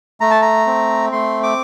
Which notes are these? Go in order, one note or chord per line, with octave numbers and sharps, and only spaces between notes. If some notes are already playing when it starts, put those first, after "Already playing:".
A3 A#5
A5
A#5
C4
A3 C6
D6